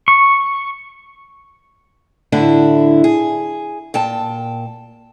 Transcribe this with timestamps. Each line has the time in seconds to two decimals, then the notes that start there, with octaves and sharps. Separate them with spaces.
0.08 C#6
2.32 A2 D3 D4 E4
3.04 G#4
3.94 A#2 G5 A5